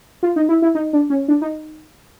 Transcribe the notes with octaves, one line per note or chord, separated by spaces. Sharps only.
F4
D#4
E4
E4
D#4
D4
C#4
D4
D#4